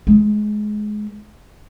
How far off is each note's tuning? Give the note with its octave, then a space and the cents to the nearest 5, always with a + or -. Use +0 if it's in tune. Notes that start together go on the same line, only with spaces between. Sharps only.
G#3 +20